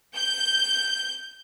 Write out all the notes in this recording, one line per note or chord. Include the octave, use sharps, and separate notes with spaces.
G6